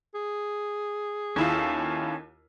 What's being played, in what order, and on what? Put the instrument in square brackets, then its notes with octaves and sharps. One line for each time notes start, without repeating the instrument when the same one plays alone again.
[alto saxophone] G#4
[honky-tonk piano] D#2 E4 F4 [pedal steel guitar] C#4 A4